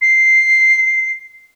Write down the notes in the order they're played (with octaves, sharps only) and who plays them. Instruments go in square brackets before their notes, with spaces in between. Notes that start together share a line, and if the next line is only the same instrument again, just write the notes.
[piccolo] C7